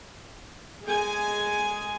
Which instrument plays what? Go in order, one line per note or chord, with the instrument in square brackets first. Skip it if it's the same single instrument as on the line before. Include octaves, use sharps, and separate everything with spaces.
[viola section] G#3 G#4 G#5